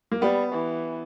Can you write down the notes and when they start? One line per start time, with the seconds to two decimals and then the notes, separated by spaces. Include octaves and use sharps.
0.11 A#3
0.21 G3 B3
0.53 E3